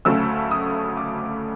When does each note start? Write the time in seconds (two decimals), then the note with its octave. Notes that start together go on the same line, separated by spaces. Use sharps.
0.05 D2 C#3 F#3 A3 C#4 E6
0.51 D#6
0.97 D6